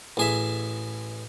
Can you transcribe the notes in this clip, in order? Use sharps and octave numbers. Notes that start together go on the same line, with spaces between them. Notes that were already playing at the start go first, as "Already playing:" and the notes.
A1 G#4 E5